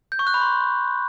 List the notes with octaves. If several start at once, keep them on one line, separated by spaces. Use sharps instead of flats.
G6
C#6
F#6
B5
C6